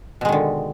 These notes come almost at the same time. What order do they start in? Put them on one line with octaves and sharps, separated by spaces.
B2 G#3 D#3 D3